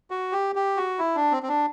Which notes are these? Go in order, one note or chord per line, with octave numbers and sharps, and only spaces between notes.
F#4
G4
G4
F#4
E4
D4
C4
C4
D4